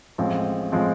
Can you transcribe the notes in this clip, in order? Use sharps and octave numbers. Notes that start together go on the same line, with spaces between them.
A1 A2 F3 G#3 C4
A2 F3 G#3 C4